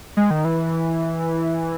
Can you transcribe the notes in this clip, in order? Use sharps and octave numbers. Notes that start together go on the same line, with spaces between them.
G#3
D#3
E3